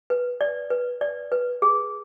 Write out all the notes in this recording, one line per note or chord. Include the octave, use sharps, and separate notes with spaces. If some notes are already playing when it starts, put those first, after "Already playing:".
B4
D5
B4
D5
B4
G#4